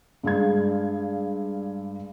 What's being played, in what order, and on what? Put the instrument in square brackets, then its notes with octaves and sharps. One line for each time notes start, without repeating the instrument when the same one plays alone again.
[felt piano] G2 G#3 F5 G#6